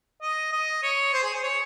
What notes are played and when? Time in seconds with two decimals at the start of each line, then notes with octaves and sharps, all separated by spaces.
0.22 D#5
0.52 D#5
0.83 C#5
1.13 C5
1.23 G#4
1.34 C5
1.44 C#5